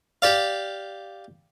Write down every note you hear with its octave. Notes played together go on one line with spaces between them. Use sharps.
G4 D5 F5